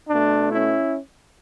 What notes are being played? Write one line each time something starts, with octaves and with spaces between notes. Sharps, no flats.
B2 A3 D4
C#4 E4